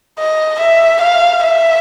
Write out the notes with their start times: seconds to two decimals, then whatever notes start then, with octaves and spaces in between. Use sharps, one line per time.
0.19 D#5
0.60 E5
1.01 F5
1.44 E5